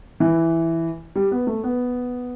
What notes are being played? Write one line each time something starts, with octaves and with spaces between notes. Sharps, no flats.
E3
G3
B3
A3
B3